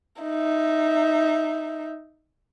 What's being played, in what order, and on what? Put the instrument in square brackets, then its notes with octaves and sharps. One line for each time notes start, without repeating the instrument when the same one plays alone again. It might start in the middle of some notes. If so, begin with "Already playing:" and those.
[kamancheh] D#4 E5